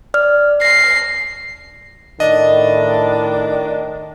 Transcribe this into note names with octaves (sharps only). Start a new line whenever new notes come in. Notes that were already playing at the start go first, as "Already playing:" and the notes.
D5 F6
A#6 C7
A2 D#3 D4 D#5